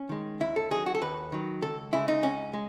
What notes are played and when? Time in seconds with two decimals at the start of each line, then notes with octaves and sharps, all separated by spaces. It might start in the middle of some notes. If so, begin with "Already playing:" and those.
Already playing: C#4
0.09 D#3 G#3
0.40 D#2 E4
0.56 A4
0.71 D#3 F#3 G#4
0.86 F#4
0.95 A4
1.01 D#2 B4
1.32 D#3 F#3
1.62 C#2 A4
1.93 C#3 G#3 E4
2.08 D#4
2.23 C#2 C#4
2.53 G#3